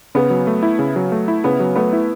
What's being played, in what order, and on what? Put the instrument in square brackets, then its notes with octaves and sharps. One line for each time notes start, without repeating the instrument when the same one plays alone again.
[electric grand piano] C#3 [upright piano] B3
[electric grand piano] F#3
A3
E4
C#3
F#3
A3
E4
[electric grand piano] C#3 [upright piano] B3
[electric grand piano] F#3
[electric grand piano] A3 [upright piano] B3
[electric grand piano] E4